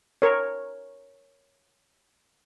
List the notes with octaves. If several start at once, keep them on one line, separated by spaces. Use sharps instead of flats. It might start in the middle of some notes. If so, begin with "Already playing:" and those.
A#4 C#5